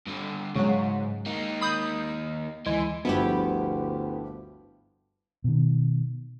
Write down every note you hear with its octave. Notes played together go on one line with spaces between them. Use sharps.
G2 D3
G#2 C#3 F#3 G#3
A#3 D#4
B5 D#6 G6
D2 E3 G#3
G1 D2 F3 B3 E4 G4
B2 D#3